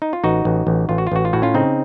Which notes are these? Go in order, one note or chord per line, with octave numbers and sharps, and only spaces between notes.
D#4
F4
A1 D#4 F#4
A1
A1
A1 F4
F#4
F4
A1 F#4
F4
A2 F#4
C#4 F4
C#3 C4 D#4